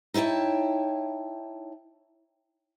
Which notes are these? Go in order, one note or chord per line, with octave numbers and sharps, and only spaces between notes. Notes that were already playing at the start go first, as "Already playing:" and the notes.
D#4 E4 C#5 G5 A5